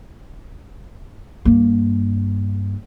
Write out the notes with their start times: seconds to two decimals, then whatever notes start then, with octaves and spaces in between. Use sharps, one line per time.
1.45 G2 A#3